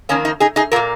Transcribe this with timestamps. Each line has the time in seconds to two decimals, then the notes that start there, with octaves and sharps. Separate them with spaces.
0.09 F2 D#3 A#3 C#4
0.25 D#4
0.40 D#4 G#4
0.56 D#4 G#4
0.72 A#2 F4 A#4
0.76 A#3